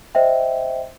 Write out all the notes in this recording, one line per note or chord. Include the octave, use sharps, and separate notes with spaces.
C5 D#5 E5 G5